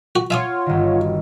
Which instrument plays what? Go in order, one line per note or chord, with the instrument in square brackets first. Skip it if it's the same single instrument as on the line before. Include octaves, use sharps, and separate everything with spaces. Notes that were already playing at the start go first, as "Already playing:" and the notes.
[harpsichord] F#4
[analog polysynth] F4 C#5 [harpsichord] E5 G#5 D#6 [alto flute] F#5
[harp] G1 D#3
[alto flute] F#4